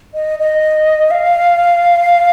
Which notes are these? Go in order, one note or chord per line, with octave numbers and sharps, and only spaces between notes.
D#5
D#5
F5